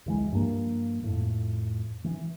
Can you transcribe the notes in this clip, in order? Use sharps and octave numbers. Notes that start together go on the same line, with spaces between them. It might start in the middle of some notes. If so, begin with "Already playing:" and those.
D2 E3 G#3
G2 F3 A#3
F2 A2
E3